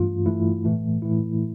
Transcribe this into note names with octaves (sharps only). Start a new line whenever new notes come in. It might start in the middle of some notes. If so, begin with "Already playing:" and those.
Already playing: G2 E3 A3 F4
G2 E3 A3 E4
A2 E3 A3
A2 E3 A3 E4